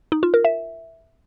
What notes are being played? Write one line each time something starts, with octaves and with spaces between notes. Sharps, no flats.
D#4
F4
A#4
E5